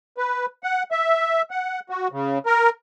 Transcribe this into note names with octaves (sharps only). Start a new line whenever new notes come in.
B4
F#5
E5
F#5
F#4
C#3
A#4